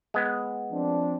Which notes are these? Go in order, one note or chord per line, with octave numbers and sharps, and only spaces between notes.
G#3 B3
F3 C4 D4